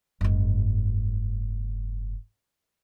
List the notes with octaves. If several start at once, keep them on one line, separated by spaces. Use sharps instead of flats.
F#1 G#2